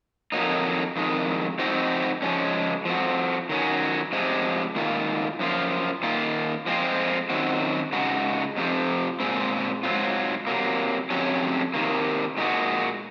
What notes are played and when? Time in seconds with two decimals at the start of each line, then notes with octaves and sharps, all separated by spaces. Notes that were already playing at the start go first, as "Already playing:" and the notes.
0.32 F2 D#3 F#3 A#3 D#4
0.96 F2 D#3 G#3
1.59 F3 C4 D#4 F#4
2.22 F3 G#3 C#4
2.85 F3 C4 F#4
3.49 D#3 F#3 C#4
4.13 C3 F3 G#3
4.75 G#2 D#3 A#3 F4
5.39 F#2 F3 A#3 F4
6.03 D#3 A#3 F4
6.66 F3 G#3 C4 F4
7.30 F#2 D#3 F#3 C4 F#4
7.93 C#3 G#3 D#4 F#4
8.56 F2 C3 F3
9.20 A#2 G#3 C4
9.83 G#2 F#3 C4 F4
10.47 C3 F#3 A#3
11.10 F2 C3 F#3 C#4
11.74 C3 D#3 A#3
12.37 A#2 G#3 D#4 F#4